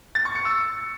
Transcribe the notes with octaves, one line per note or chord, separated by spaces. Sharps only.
A6
C#6
C#7
E6